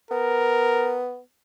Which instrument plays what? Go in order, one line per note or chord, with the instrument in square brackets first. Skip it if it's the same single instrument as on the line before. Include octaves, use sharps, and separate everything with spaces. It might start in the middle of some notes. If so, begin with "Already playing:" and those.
[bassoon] B3 [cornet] A#4